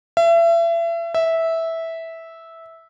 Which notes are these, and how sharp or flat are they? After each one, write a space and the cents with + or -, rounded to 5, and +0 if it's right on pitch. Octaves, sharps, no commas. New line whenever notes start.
E5 +35
E5 -10